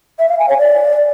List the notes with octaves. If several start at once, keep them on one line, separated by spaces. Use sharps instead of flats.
E5
F5
G#5
C#5
D5